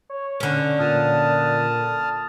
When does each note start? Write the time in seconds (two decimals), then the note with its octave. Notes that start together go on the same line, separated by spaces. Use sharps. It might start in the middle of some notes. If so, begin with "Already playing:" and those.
0.10 C#5
0.40 D3 C#4
0.80 A#2 A5 D#6 F6